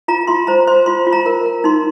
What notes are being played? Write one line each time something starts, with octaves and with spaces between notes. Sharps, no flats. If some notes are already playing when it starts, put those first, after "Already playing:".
F4 A#5
F4 C6
C5 A#5
C5 C6
F4 C6
F4
A#5
A#4
A#4
D#4 C6